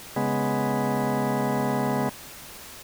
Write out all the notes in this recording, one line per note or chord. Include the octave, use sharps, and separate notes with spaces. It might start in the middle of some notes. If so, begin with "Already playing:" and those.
C#3 G#3 B3